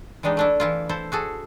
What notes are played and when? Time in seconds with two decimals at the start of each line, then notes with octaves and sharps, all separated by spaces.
0.23 E3 G3 G#3 D4 D#4
0.37 A3 D4 E4
0.60 E3 E4 F4
0.89 E4 A4 C5
1.12 F#4 G#4 A4